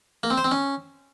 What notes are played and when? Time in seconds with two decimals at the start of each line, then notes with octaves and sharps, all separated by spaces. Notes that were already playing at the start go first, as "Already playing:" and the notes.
0.23 A#3
0.30 C4
0.37 C5
0.44 C4
0.51 C#4